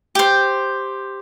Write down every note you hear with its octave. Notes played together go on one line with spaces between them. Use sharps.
G4 C5